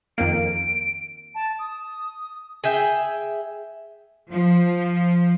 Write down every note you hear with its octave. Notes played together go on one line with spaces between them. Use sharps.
F2 D#3 A#3 D7
A5
D#6
G#4 E5 G5
F3